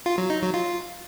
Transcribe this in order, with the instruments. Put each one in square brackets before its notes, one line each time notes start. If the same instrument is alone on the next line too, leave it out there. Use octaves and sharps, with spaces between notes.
[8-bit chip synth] F4
F#3
D#4
F#3
F4